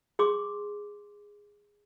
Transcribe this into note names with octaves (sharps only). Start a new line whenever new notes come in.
G#4 C6 D6